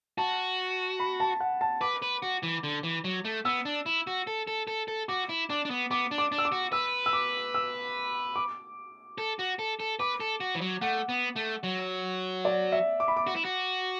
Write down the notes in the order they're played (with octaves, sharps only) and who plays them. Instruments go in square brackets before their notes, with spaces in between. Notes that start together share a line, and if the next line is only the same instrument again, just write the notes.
[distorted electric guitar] F#4 [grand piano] A5
[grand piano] B5
A5
F#5
A5
[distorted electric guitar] B4 [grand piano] D6
[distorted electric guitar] B4
F#4
E3
D3
E3
F#3
A3
[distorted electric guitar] B3 [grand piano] E6
[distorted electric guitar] D4
E4
F#4
A4
A4
A4
A4
[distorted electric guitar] F#4 [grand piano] D6
[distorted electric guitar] E4
[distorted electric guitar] D4 [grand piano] D6
[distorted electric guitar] D4
B3
[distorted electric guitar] B3 [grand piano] D6
[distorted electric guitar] D4
[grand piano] D6
[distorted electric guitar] D4
[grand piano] E6
D6
[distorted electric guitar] F#4
[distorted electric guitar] B4 [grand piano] E6
[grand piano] E6
D6
E6
D6
[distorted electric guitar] A4
F#4
A4
A4
[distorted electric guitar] B4 [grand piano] D6
[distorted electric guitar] A4
F#4
E3
F#3
[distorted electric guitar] A3 [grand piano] F#5
[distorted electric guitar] B3
A3
F#3
[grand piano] D5
E5
D6
B5
D6
[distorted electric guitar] F#4
E4
F#4